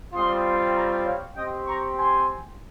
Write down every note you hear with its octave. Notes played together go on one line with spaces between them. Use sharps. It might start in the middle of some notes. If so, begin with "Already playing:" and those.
G3 C4 F4 C6 D#6
A#5 C#6
C#5 F5
C4 G4 D#5 G5
A#5 C#6
G#5 C6